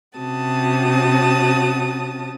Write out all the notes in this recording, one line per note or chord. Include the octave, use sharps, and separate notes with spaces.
C3 C#4 F#4 A5 D#6